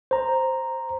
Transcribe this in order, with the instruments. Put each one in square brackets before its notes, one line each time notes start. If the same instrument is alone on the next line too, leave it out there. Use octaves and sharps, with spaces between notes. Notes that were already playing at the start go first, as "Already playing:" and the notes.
[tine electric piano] C5 A#5